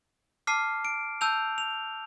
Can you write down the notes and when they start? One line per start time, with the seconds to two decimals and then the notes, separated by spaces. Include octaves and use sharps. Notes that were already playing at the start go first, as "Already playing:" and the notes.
0.47 A5 D6 F6 C7
0.85 D7
1.21 A5 E6 G6 F7
1.58 F7